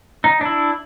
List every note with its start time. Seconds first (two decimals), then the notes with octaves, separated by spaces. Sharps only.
0.24 D#4
0.41 D4 E4